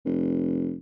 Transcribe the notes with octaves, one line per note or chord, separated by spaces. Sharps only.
F1